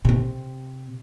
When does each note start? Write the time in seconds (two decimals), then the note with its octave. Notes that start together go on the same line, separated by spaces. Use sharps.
0.05 C3 C4